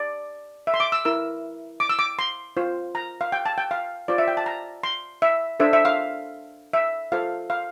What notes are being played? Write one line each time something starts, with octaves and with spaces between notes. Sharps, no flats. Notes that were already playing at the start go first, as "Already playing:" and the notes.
Already playing: D5
E5
C6
D6
E6
E4 A#4 E6
D6
E6
D6
C6
F4 C5
A#5
F5
G5
A5
G5
F5
F4 C5 D5
E5
G5
A5
A#5
C6
E5
D4 A4 C5 E5
E5
F5
E5
F4 A4 C5 F5
F5